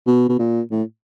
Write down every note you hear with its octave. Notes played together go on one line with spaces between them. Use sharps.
B2
B2
A#2
A2